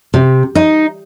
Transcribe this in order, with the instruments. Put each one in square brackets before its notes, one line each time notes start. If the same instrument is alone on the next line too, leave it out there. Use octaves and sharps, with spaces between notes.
[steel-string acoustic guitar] C3
D#4